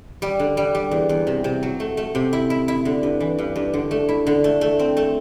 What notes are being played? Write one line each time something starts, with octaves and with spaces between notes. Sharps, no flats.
G3
D3
G3
G3
E2
E2
C3
C3
F#3
A3
A3
C3
E4
E4
E4
D3
G2
E3
G2
G2
D3
A3
E4
D3
A3
A3
C4
A3